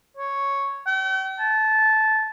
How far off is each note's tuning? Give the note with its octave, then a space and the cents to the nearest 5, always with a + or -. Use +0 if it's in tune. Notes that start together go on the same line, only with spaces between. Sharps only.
C#5 +0
G5 -45
A5 -15